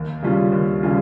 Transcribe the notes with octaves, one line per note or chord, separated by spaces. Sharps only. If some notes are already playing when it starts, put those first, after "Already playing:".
Already playing: D#2
C#3 G3 C#4 F4
D#2
C#3 G3 C#4 F4